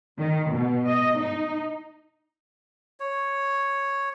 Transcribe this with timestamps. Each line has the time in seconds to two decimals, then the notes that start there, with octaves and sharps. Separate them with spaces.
0.18 D#3
0.50 B2
0.88 D#5
1.19 D#4
3.00 C#5